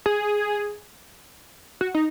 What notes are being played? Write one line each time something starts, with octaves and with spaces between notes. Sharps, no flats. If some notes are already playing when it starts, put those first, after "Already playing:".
G#4
F#4
D#4